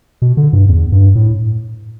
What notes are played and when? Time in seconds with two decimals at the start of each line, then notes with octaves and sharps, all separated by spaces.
0.22 B2
0.37 D3
0.53 G2
0.69 E2
0.92 G2
1.15 A2